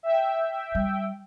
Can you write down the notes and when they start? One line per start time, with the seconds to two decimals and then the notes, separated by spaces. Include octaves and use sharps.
0.03 E5 G5
0.75 G3